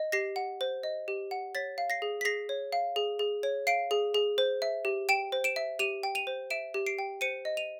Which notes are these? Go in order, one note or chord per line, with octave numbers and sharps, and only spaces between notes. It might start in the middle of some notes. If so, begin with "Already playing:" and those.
Already playing: D#5
G4 A#6 C7
F#5
C5
D#5
G4
F#5
C#5 A6 B6
F5
A#6 C7
G#4
B6
G#4 A#6 C7
C#5
F5
G#4
G#4
C#5
F5 C7 D7
G#4
G#4
C5
E5
G4
G5 D7 E7
C5
D7 E7
E5
G4 D#7 F7
G5
D#7 F7
C5
E5 D7 E7
G4
C7 D7
G5
C5 C#7 D#7
D#5
D#7 F7